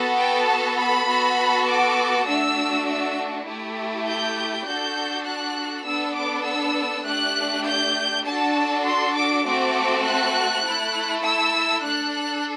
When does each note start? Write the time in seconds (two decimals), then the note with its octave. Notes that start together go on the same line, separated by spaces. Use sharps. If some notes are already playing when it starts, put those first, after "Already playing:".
Already playing: B3 F#4 A4
0.18 G5
0.48 A5
0.78 B5
1.07 B3 F#4 A4
1.68 D6
2.27 A3 D4 F#4 E6
2.88 E6
3.47 A3 E4 G4
4.07 G6
4.66 D4 F#4 A4 G6
5.26 F#6
5.86 B3 D4 A4 E6
6.16 D6
6.46 E6
7.06 A3 D4 G4 F#6
7.66 G6
8.26 D4 F#4 A4 A5
8.85 C6
9.15 D6
9.45 A3 C4 F#4 A4 D6
10.05 F#6
10.65 A3 E4 A4
11.24 E6
11.84 D4 A4 F#6
12.14 F#6